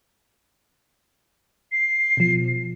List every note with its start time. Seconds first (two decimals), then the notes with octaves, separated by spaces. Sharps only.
1.72 C7
2.17 B2 F3